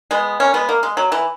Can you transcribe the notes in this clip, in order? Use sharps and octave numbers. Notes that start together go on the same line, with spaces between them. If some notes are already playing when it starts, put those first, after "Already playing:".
G#3 B3
A#3 C#4
G#3 B3
A#3
G#3
F#3
E3